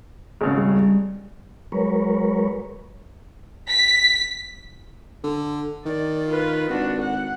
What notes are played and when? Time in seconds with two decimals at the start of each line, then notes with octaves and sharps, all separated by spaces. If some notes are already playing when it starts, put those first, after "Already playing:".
0.41 G#1 C#3 G#4
0.58 G3
1.72 F#3 G#3 A#4 B4 C#5
3.69 B6
5.24 D3
5.85 D#3 D5
6.28 F4 B4
6.69 G#1 D4 F#4
7.01 F#5